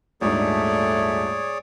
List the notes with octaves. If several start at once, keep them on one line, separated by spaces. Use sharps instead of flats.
D#1 G#2 A3 D4 G#4 C#5 D5